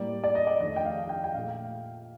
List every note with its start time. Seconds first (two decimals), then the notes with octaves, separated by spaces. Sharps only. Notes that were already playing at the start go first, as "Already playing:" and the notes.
Already playing: A2 G3 A#3 D5
0.24 D5
0.35 D#5
0.47 D5
0.60 F2 D#3 A3 D#5
0.76 G5
0.85 F5
1.09 G5
1.24 G5
1.34 A#2 A3 F5